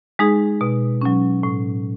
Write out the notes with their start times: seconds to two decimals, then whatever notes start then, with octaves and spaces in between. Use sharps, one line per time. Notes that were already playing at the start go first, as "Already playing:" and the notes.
0.19 G#3 D#4 G#4
0.61 B2
1.01 F#3 C#4
1.43 A2